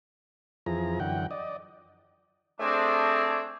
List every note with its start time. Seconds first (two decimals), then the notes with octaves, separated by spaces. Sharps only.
0.66 F2 E3 F3 G#4 A#5
1.00 F#2 D3 E3 F#5 G5
1.31 D5 D#5
2.59 A3 C4 D4 G#4